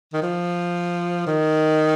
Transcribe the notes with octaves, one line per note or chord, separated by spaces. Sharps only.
D#3
F3
D#3